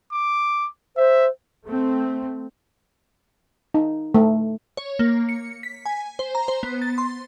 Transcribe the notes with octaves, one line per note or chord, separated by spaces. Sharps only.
D6
C5 E5
A3 C4
D#4
A3
C#5
A#3
C#7
B6
G#5
C5
A#5
C5
B3
A6
C6